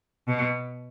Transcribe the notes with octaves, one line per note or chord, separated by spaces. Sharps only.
B2